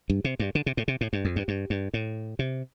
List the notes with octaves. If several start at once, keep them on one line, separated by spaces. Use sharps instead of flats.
G2
C3
G2
D3
C3
A2
C3
A2
G2
F2
G2
G2
G2
A2
C3